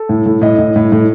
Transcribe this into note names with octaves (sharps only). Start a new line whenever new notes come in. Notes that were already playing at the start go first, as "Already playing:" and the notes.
Already playing: A4
A2
A2
A2 D#5
A2
A2
A2